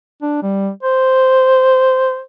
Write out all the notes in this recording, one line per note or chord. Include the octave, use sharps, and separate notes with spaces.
D4
G3
C5